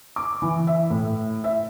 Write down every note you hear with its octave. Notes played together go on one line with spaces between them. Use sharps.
D6
E3
E5
A2
E5